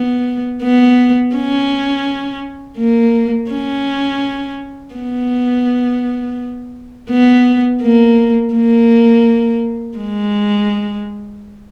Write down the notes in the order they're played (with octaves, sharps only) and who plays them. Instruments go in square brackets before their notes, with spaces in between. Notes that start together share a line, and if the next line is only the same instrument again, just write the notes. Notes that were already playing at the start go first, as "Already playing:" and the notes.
Already playing: [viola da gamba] B3
B3
C#4
A#3
C#4
B3
B3
A#3
A#3
G#3